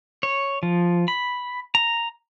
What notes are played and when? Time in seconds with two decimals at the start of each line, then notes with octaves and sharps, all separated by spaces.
0.23 C#5
0.63 F3
1.08 B5
1.75 A#5